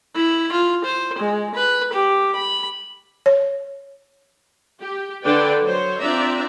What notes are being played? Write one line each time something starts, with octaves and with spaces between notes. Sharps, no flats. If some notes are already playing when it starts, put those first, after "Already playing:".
E4
F4
C5
G#3
B4
G4
B5
C#5
G4
D3 D4 A4 B4 D5 G5
F#3 C5 C#5
C4 D4 F4 D5 E5 A#5